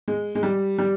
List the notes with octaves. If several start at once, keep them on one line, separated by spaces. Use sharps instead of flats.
G#3
G#3
G3
G3